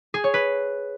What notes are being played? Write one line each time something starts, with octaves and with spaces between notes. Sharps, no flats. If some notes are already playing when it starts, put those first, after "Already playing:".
G#4
C#5
B4